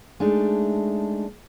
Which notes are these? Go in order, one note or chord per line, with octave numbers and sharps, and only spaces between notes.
G#3 A3 D4 D#4